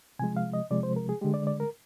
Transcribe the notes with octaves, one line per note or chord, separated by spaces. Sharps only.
C3 F3 G#3 G#5
F5
D#5
C3 F3 G#3 D5
C5
A#4
G#4
D3 G#3 G4
D5
D5
A#4